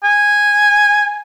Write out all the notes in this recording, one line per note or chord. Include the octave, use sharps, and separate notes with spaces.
G#5